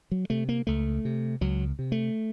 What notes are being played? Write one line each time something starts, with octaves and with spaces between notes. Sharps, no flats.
F#3
C3 A3
A#3
C#2 A3
C3
C#2 F#3
C3
A3